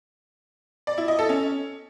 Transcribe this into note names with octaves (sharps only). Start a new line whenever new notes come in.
D5
E4
D#5
A4
C#4